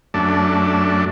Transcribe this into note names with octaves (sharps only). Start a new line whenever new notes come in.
F#2 A3 D4